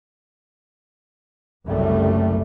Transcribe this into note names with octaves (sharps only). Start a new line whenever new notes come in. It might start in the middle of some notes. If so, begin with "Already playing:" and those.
F#1 C2 F#2 G3 A3